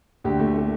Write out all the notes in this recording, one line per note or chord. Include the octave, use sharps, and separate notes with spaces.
D2 G4
A3
A3